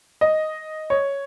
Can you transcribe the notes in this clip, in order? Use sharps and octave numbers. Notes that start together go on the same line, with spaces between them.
D#5
C#5